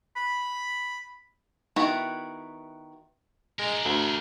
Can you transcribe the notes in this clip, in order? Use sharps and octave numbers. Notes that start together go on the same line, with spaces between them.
B5
D#3 B3 E4 F#4 B4
G#3 D4 A#4
D2